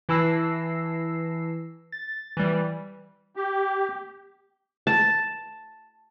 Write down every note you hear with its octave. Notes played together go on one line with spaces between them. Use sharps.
E3 E4 A5 E6 A#6 C7
A6
E3 G3
G4
A5